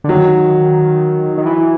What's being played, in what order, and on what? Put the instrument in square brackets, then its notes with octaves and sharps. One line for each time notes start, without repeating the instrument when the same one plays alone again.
[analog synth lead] D3
[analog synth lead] D#3 [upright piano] F#3
[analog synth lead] D#3
E3